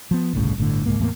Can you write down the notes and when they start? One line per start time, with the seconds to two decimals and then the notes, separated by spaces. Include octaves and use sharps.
0.11 F3 B3
0.33 G1 C2 A2 C#3
0.58 G1 A2 D3
0.86 C#2 G#2 A#3
1.00 E2 A2 A#3